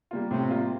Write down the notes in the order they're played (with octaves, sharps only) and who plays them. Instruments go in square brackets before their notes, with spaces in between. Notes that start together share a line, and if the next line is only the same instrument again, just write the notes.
[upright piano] G3 A#3 F4
[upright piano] A2 [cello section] C3
[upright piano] G3 A#3 F4